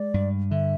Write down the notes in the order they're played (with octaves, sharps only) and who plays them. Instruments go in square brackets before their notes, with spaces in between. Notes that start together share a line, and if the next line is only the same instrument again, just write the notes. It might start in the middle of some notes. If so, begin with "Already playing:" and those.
Already playing: [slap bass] G#3 [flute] D5
[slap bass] G2
[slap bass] D3 [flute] E5